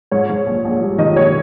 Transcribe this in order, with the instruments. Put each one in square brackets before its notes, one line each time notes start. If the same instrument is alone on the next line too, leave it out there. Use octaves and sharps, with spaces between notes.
[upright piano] G#2 C#5
G#2
A#1
A#1
G3
D#3 D#5
A#1 C#5